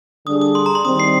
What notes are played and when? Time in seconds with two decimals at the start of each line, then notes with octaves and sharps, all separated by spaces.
0.27 D3 G3 D4 G#4 D#6
0.41 D#6
0.55 C6
0.66 A#5
0.75 C6
0.84 D#3 G3 C4 D#6
1.00 C7